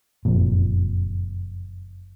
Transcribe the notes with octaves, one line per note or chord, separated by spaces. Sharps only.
F#1 F2 A#2